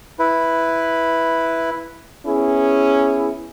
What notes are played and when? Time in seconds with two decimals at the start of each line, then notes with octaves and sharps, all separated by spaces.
0.19 E4 B4
2.26 B3 C#4 E4 G#4